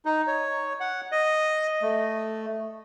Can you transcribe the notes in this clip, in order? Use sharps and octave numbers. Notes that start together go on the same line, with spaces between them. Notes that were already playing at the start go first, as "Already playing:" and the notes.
D#4
C#5
F#5
D#5
A3